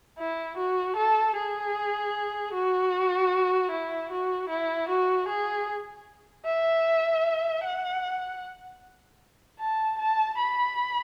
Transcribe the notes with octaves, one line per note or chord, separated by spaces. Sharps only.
E4
F#4
A4
G#4
F#4
E4
F#4
E4
F#4
G#4
E5
F#5
A5
A5
B5